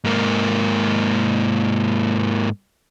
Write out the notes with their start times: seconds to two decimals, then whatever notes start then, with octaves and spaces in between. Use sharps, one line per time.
0.04 G#2 A#3